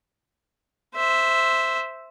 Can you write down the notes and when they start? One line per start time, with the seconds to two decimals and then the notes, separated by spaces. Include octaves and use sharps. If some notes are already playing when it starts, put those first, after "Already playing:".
0.95 C5 E5